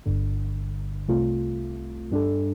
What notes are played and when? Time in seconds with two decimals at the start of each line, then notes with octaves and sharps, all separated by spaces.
0.06 G1 G2 D3
1.08 C2 C3 A3 F4
2.11 G2 G3 D4 A4